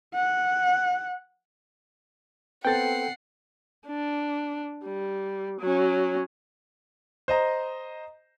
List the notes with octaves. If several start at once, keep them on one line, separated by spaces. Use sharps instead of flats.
F#5
B3 C4 A4 F#5 G5 A6 C7
D4
G3
F#3 C#4
C5 D#5 A#5